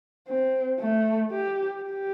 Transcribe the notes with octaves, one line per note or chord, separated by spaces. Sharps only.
C4
A3
G4
G4